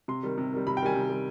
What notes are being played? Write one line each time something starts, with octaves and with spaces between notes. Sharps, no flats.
C3 C6
D#3 G3
C3
D#3 G3
C3 B5
G5
D#3 G3 G#5
C3
D#3 G3